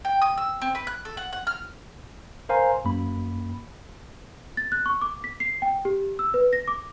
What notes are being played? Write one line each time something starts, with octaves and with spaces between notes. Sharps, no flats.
G5
D#6
E6
C4
B4
F#6
A4
F#5
F#5
F6
A#4 C5 F5 G#5 A#5 C6
F#2 A#3 B5
A6
F#6
C#6
D6
B6
C7
G5
G4
E6
B4
A#6
D6